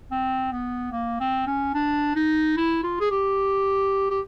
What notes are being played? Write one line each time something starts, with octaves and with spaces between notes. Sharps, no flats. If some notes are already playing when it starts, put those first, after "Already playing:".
C4
B3
A#3
C4
C#4
D4
D#4
E4
F4
G#4
G4
G4